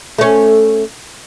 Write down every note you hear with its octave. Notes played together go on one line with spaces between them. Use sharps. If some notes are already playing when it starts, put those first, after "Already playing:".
A3 C#4